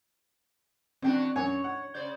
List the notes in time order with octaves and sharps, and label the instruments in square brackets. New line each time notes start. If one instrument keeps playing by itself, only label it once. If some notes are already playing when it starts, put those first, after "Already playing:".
[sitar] E2 D4 F#4 [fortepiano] C4 G5
[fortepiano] F#2 G#5 [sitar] C#5
[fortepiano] F#5
[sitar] C#3 C5 D5